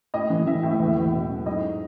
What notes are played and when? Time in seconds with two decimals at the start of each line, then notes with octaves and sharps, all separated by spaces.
0.14 A2 D#5
0.30 E3
0.47 E3 E5
0.63 A2
0.71 E5
0.80 E2
0.97 E2
1.13 B2
1.30 F#3
1.46 G#2 D#5